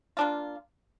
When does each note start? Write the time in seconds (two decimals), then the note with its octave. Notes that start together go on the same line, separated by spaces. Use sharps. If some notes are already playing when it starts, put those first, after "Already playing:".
0.17 A#3 D4 F4